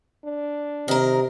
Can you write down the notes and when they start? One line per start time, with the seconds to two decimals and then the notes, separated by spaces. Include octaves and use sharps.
0.25 D4
0.88 C3 D#3 A#4